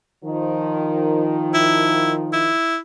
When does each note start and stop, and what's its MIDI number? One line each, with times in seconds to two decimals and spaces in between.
0.24 2.52 51
0.24 2.52 53
1.54 2.13 64
2.33 2.78 64